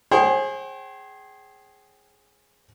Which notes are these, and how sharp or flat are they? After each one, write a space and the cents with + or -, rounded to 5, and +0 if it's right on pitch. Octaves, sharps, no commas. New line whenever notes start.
G#4 +0 C5 +40 G5 -30